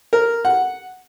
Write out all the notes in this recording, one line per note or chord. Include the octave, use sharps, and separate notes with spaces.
A#4
F#5